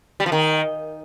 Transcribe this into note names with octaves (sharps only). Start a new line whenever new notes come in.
G3
F3
D#3